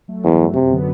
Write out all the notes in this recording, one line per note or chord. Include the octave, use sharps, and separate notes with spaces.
F#3 A3
E2 G2
F#3 A3
F#2 C3
D3 F#3 B3